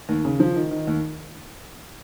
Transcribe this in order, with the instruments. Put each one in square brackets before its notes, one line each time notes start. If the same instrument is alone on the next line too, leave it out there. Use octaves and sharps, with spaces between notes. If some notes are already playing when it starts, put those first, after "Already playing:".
[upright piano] D#2
C#3
F3
D#3
D#3
D#2